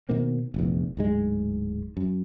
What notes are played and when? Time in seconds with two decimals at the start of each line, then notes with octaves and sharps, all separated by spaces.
0.09 B2 D#3 A#3 C4
0.54 F1 A#1 E2
0.97 D1 G#2 G#3
1.97 F#2